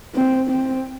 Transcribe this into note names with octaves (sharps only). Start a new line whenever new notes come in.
C4
C4